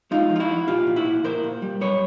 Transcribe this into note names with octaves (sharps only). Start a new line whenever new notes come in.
G#3 D#4 F4
F3
F4
E4 F#4
F2
A#2 F4 G4
A#2
E4 F#4
A#2
A#2 A#4 C5
A#2
G3
F#2 B4 C#5